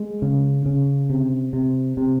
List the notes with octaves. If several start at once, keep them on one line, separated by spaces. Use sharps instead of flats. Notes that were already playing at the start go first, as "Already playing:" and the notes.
Already playing: G#3
C#3
C#3
C3
C3
C3